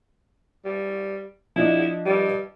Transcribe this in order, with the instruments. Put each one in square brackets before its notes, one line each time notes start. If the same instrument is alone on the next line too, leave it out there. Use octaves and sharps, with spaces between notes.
[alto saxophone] G3
[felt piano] F3 D4 D#5 [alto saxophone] E4
[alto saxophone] G3